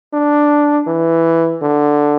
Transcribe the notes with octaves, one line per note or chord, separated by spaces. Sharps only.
D4
E3
D3